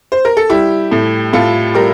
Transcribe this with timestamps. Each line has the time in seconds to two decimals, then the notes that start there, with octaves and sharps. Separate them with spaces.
0.12 C5
0.25 A#4
0.37 A4
0.50 G3 E4 G4
0.92 A2
1.33 A2 F4 A4
1.74 G3 G4 A#4